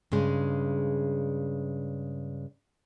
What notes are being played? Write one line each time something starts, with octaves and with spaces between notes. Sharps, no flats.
G2 C#3 G#3